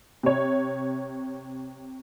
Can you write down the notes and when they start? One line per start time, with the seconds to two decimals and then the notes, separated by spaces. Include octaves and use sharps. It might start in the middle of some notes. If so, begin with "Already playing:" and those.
0.23 C3 C#5